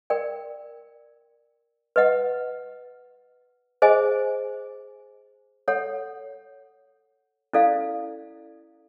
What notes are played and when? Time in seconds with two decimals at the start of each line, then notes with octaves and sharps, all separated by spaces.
0.10 A#4 D5 G5
1.96 B4 D#5 F#5
3.82 G#4 C5 D#5 G#5
5.68 A4 C#5 F#5
7.53 C#4 E4 A4 D5 F5